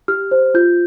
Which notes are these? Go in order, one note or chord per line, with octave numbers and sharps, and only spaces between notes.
G4 F6
C5
F4 G6